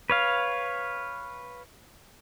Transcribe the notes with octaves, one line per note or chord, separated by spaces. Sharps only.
B4 C#5 F5